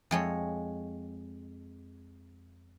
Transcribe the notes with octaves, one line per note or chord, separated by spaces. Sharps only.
F2 G#3 C#5